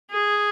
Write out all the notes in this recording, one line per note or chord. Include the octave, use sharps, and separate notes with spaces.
G#4